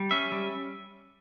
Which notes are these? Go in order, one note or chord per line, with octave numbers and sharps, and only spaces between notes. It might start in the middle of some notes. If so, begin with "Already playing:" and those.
Already playing: G3
C#4 E5
G3